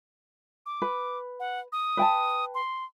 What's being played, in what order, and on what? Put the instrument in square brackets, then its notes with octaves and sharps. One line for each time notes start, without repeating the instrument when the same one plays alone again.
[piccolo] D6
[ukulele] B4
[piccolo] F#5
D#6
[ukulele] B4 G5 A5
[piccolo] C6